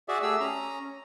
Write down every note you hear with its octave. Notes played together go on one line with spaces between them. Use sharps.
F#4 G#4 D5 E5
A3 G4 G#4 E6
C#4 A#5